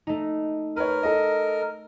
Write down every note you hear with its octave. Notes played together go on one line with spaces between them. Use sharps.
A3 D#4
A#4 B4 C#5
A4 D#5